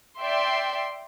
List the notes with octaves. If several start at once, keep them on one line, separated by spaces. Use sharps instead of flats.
D5 E5 G5 C6